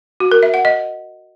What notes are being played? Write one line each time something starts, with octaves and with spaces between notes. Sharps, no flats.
F#4
A#4
E5
F#5
D#5